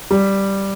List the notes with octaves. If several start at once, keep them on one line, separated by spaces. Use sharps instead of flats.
G3